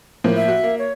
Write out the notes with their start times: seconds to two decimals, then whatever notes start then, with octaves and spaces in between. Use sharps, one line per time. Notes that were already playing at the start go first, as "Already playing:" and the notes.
0.24 A2 F3 A#3
0.36 E5
0.48 F#4
0.64 A#3
0.79 C#5